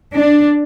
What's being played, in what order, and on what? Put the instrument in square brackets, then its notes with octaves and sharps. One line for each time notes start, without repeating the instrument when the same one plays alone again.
[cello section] D4